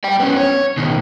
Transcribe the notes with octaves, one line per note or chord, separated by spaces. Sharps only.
D5 G5
B3 C#4
C#5
B2 D#3